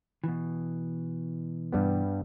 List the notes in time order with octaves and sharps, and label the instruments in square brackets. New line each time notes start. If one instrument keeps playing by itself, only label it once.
[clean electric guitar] B2 E3
[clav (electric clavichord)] G2 G3 B3